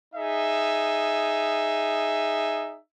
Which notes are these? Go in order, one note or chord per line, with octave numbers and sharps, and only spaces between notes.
D#4 G#4 E5